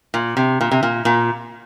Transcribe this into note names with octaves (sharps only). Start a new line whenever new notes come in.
A#2
C3
A#2
C3
A#2
A#2